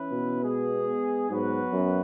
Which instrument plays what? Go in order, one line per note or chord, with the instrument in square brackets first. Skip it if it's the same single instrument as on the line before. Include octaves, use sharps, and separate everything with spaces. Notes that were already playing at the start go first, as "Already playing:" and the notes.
Already playing: [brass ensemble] E3 C#4 E4 B4
[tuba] B2
[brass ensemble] G#3 B3 G#4
[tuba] G#2 [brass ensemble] F#3 B3 F#4 B4
[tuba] F#2